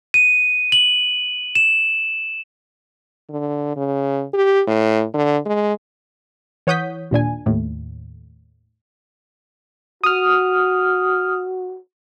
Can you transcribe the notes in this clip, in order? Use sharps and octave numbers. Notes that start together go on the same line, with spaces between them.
D#7
F#7
E7
D3
C#3
G4
A2
D3
G#3
E3 C#5 F#5 D#6 G6 B6
D#2 A#2 D4 G#5
D#2 A2
F#4 D#6 F6